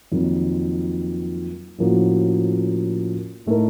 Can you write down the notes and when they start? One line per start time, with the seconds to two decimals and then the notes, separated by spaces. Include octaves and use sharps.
0.12 F2 D#3 F#3 A#3
1.78 A2 F3 A#3 C#4 F#4
3.46 A2 A3 D#4 A#4